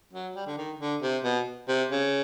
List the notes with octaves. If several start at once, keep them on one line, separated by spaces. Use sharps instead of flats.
F#3
G3
D3
D#3
D3
C3
B2
C3
C#3